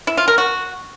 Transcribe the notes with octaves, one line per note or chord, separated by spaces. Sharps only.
E4
F4
A#4
F#4